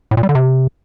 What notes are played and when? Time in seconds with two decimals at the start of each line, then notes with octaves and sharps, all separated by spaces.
0.11 A2
0.17 A#2
0.23 G3
0.29 D3
0.35 C3